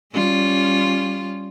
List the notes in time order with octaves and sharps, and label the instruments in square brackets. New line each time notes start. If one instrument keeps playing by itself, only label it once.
[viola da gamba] G3 C#4 F4